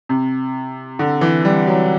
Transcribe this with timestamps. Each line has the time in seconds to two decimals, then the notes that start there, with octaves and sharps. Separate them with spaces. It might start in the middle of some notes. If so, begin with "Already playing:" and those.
0.09 C3
0.99 D3
1.21 E3
1.45 G3
1.67 F#3